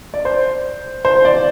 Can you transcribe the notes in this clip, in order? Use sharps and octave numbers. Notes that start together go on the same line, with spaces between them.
D5
C5
C5
D5